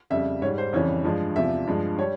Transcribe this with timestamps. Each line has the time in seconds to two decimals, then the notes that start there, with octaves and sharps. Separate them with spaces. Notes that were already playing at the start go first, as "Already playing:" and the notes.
0.10 F2 C#3 G3 E5
0.42 G#2 G3 C#5
0.58 C5
0.73 F2 C#3 E3 G3 C#5
1.04 G2 F3 G#3
1.36 E2 C3 F3 E5
1.67 G2 F3 G#3
1.98 G3 C#5